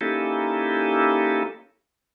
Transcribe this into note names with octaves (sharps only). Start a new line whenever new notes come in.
A#3 C#4 D#4 E4 G4 A4